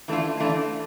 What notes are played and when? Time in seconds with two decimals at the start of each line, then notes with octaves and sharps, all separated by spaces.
0.08 E3 A3 D4 F4
0.40 E3 A3 D4 F4